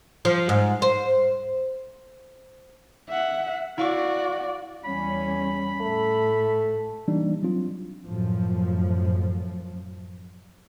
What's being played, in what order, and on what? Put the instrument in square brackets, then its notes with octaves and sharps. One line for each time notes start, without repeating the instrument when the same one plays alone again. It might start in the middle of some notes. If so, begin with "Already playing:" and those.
[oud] F3
G#2
C5
[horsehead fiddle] E5 F#5
[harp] E4 F5 C#6 [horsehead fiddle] F#4 D5
[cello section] E2 G3 C#4 [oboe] B5
[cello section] A2 [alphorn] A3
[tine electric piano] E3 G3 A#3 D4 D#4
F#3 C4 D4 F4
[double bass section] F#2 A2 F3